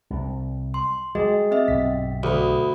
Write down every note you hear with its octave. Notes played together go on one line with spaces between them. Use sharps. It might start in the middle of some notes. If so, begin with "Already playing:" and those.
C2
C6
G3 G#3 F#4 G#4 D#5
C4 D#5 E5
B1 G2 B6
D2 A4 B5